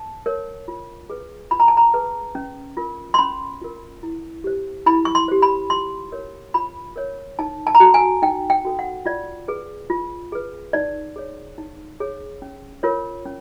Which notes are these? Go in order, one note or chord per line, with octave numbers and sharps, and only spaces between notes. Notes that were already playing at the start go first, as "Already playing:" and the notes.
Already playing: A5
A#4 C#5
F4
G#4 B4
F4 B5
A#5
A5
A#5
G#4 B4
C#4
F4 A#4
C6
C#4 B5
F4 A#4
E4
G4 C5
E4 B5
C#6
C6
G4 C5
B5
F4 C6
A#4 C#5
F4 B5
A#4 C#5
D#4 A5
A5
A#5
F#4 A4 A5
G#5
D#4 G5
G5
F#4 A4
F#5
F4 D5
G#4 B4
F4
G#4 B4
D#4 D5
G#4 C#5
D#4
G#4 C#5
C#4
F4 A#4 C#5
C#4